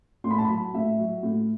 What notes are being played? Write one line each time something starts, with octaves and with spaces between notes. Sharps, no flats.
A2 C6
B5
A5
F#3 B5
A2 E5
F#3
A2